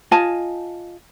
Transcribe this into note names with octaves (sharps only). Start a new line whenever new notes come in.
F4 D#5 G#5 A5